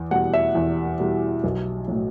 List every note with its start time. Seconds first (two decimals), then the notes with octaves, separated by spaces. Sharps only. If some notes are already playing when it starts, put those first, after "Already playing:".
Already playing: E2
0.11 B2 G3 F#5
0.34 E5
0.55 E2
1.00 B2 G3
1.44 B1
1.88 A2 F#3